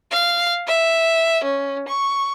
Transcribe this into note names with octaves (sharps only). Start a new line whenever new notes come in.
F5
E5
C#4
C#6